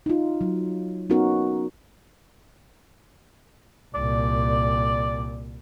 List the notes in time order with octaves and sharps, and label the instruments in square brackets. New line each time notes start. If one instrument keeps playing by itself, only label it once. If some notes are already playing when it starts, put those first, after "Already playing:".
[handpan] D#4 F4
F#3
B3 C#4 D#4 F#4 A#4
[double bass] C2 A#2 [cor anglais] D5